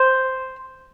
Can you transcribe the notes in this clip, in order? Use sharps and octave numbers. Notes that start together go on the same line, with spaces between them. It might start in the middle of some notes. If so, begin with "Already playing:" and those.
Already playing: C5